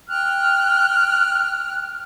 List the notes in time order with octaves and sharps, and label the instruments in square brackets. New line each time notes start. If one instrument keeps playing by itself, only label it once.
[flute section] G5 F6 F#6